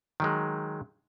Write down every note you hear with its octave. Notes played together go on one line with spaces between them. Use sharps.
D#3 F#3 G#3